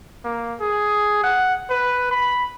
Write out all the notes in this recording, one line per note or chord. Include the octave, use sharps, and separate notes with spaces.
A#3
G#4
F#5
B4
B5